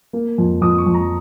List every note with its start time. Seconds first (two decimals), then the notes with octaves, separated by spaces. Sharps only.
0.13 A#3
0.38 F2
0.62 F2 D#6
0.78 C#6
0.86 F2
0.94 A#5